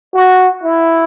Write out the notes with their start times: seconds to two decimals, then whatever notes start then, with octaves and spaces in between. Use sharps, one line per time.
0.14 F#4
0.63 E4